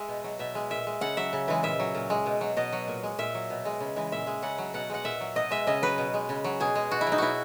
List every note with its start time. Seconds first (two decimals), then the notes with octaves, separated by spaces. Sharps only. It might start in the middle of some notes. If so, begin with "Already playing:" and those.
Already playing: G#3 E5
0.08 B2
0.24 F#3
0.39 B2 E5
0.55 G#3
0.70 A#2 E5
0.87 G#3
1.01 C#3 F#5
1.17 F#3 E5
1.33 C#3
1.48 E3 G#3
1.63 A#2 E5
1.79 F#3
1.95 A#2
2.10 G#3
2.26 B2
2.41 F#3
2.57 B2 D#5
2.72 F#3
2.88 A#2
3.03 G#3
3.19 A#2 E5
3.34 F#3
3.50 B2
3.65 G#3
3.80 C#3
3.96 E3 G#3
4.12 A#2 E5
4.27 G#3
4.42 C#3 F#5
4.58 F#3
4.74 B2 F#5
4.90 G#3 F#5
5.04 A#2 E5
5.21 F#3
5.35 B2 D#5
5.51 G#3 E5
5.67 C#3 D#5
5.82 F#3 B4
5.98 B2
6.14 G#3
6.29 C#3
6.44 F#3
6.60 B2 G#4
6.75 G#3
6.91 B2 F#4
7.01 E4
7.07 F#3
7.12 D#4
7.18 B2 E4 F#4